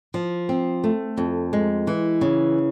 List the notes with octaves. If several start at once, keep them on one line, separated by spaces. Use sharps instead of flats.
F3
C4
A3
F2
G#3
E3
C#3